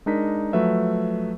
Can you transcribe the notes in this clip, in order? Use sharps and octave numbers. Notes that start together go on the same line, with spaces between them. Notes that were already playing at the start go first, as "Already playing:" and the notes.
G#3 D4 D#4 A#4 B6
F3 F#3 A3 B4 E5